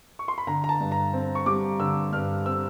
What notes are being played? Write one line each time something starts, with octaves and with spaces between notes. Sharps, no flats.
C#6
C6
B5
D3 A#5
A#5
A5
G2
A#5
C4
C#6
G3 D6
D3 E6
G2 F6
C4 E6